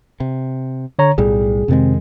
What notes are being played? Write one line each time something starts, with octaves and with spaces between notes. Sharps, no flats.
C3
D3 C#5 A#5
B1 A2 G3 G#4
F2 C3 D#3 G#3 C4